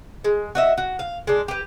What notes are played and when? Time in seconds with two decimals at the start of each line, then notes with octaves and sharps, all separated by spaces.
0.24 G#3
0.55 F#4 D#5 E5
0.78 F#4
0.99 F5
1.27 G#3 D4
1.48 G4 B4